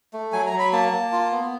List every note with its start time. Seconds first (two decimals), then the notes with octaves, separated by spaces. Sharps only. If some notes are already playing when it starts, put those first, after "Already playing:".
0.13 A3
0.32 F#3 G#5
0.46 A#5
0.52 F#3
0.59 B5
0.73 A#3 A5
0.92 A#3
1.12 F4
1.31 B3